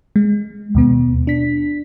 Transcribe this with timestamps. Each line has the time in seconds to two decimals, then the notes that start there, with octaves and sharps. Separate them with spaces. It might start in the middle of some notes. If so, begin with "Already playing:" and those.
0.16 G#3
0.75 D#2 B2 B3
1.27 D4 B6